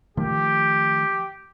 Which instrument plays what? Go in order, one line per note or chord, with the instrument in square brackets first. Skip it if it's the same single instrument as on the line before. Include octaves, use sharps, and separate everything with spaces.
[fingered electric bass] D#3 F3 A3 [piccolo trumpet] G4